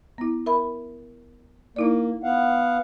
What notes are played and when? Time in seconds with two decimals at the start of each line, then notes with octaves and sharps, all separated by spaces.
0.18 B3 E4
0.46 A#4 E5 B5
1.76 A#3 D#4 E4 D5
2.23 B3 F5 F#5